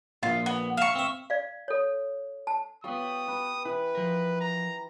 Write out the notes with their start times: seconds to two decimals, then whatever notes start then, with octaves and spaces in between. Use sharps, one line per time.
0.23 A#1 F4
0.46 B3
0.77 E5 F5 C#6
0.95 C4 E5
1.30 D5 F5
1.68 A4 C#5
2.47 A5
2.84 B3 F4 G4 G5 C#6 D#6
3.28 B4
3.65 E3 B4
3.95 F3 A#4
4.41 A#5